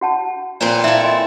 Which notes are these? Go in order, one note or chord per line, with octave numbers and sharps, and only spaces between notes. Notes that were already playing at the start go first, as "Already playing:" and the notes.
F#4 F#5 A5
A#2 C4 B4 C5 D5
E4 A4 E5 F5
D#5 G#5 C6